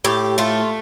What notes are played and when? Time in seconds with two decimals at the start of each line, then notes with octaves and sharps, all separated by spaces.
0.04 A2 G4
0.38 A3 F4